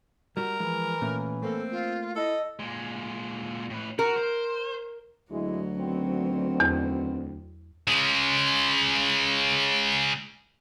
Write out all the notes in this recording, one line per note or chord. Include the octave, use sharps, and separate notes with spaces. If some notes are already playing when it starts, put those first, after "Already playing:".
G3 F#4 A#4
E3 F3 G#3
A#2 A3 C#4
A3 A#3 C4 A4
F4
E4 A4 D#5
A#2 G#3
A2 B4
F#4 A#4
C5
D2 F#3 G#3 E4
D#3 B3 C4
E2
C#3 G#3